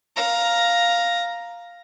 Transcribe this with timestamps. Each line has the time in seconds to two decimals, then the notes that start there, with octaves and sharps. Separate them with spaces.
0.16 F5 A#5